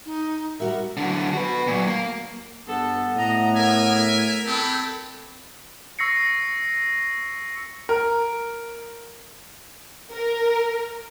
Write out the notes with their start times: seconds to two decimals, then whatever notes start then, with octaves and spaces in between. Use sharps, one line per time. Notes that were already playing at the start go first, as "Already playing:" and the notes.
0.05 D#4
0.60 G3 F#4 A#4 E5
0.97 D3 F#3
1.33 F#4 B4
1.67 A#2 F#3
1.88 A#3
2.67 G2 B3 A4
3.16 A2 D#5 A#5
3.57 A#4 E5 G#5
4.46 G#3 C4 G4 A4 B5
5.99 C#6 E6 A#6 C7 C#7
7.89 A#4
10.12 A#4